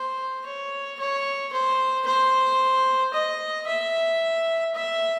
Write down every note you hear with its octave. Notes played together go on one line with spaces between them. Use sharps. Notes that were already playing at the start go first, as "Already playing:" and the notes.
Already playing: C5
C#5
C#5
C5
C5
D#5
E5
E5